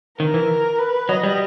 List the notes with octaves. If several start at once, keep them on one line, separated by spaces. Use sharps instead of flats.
D#3 A#4
E3
B4
F#3 D#5
G3